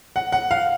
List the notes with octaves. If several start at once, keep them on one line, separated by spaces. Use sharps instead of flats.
F#5
F#5
F5